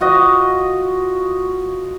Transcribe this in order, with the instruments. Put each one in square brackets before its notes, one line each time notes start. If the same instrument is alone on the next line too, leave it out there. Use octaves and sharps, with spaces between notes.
[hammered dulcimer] F4 F#4 D#5